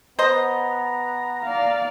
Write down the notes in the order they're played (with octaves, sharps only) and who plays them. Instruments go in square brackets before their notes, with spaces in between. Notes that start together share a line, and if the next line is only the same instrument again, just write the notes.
[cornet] B3 [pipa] C5 D#5 [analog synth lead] A#5
[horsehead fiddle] D5 F5